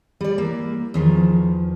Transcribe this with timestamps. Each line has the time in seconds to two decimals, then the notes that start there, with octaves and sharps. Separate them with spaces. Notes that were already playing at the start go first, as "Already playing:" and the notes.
0.21 G3 D5
0.38 E3 A#3
0.94 E2 D#3 F3